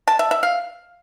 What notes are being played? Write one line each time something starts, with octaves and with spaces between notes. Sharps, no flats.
A5
E5
E5
F5